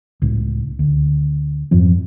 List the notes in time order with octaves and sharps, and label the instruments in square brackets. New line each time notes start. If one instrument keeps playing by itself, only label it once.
[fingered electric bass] C#2 A2
D2
F2 G#2 F3 C4